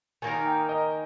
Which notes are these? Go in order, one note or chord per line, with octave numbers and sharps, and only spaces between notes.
D#3 A#3 D#4 A#4 G#5
G5
D#5